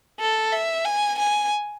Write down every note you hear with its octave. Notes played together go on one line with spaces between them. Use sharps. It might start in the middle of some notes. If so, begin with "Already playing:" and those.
A4
E5
G#5
G#5